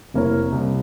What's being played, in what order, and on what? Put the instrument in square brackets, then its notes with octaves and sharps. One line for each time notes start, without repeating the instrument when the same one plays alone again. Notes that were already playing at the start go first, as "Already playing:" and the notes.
[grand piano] F1 A#3 E4 C#5
C2